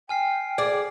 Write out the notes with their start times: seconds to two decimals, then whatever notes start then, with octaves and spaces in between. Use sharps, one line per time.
0.09 G5 G#5 F6 C7
0.58 G#4 D5